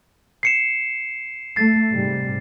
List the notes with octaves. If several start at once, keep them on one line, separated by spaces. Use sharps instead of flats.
C7 C#7 E7
A3 A6 C7
G#2 C3 G3